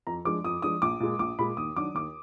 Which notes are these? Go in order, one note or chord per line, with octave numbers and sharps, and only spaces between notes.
F2 A#5
F3 G#3 D4 D6
F2 D#6
F3 G#3 D4 D#6
A#1 D6
A#2 G#3
A#1 D6
A#2 G#3 B5
D#2 D#6
D#3 F#3 D4 D6
D#2 D6